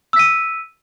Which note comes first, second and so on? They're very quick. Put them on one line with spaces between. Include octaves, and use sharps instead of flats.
E6 B6 D#7